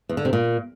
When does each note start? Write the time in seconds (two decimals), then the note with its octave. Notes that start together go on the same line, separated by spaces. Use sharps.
0.09 E2
0.17 D3
0.25 C3
0.33 A#2